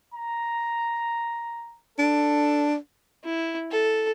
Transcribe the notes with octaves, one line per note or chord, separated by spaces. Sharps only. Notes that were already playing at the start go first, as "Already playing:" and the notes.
A#5
D4 A4
E4
A4